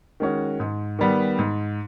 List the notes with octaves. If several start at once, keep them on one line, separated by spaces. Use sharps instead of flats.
D#3 G#3 C#4 F#4
G#2
D#3 G3 B3
G#2